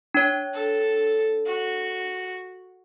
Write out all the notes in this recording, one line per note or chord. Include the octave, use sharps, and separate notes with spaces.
D4 C#5
A4
F#4